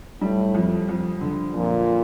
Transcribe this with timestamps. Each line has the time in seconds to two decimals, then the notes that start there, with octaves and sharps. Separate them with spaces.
0.21 A2 G3
0.55 F2
0.89 F2
1.21 D3
1.54 F2 A#2